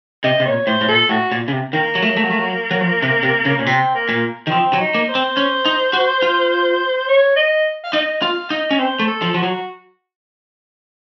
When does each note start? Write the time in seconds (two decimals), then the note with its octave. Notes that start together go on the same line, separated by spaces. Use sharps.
0.24 C3 D#5
0.40 C3
0.46 A#2 C#5
0.67 A2 C5
0.81 A2
0.88 A#2 A4
1.09 A2 F#4
1.32 A#2
1.48 C#3
1.52 C3
1.73 D#3 A#3
1.95 F#3
2.02 A3
2.09 F#3
2.17 A3
2.23 F#3
2.31 A3
2.39 F#3
2.71 F#3
2.81 F3
3.02 C3
3.23 C3
3.45 C#3
3.58 A#2 C#4
3.66 C3 C4
3.94 A#3
4.09 A#2
4.47 D#3
4.51 F3 C4
4.73 F#3
4.80 D#4
4.94 A#3
5.08 C5
5.15 C4
5.37 C#4
5.65 D#4
5.93 F#4
6.22 F4
7.08 C#5
7.36 D#5
7.84 F5
7.93 D#4 D#5
8.22 F4 F5
8.50 D#4 D#5
8.71 C#4
8.79 C4 C5
8.99 A3
9.07 A4
9.22 F3
9.34 F3 F#4
9.43 F#3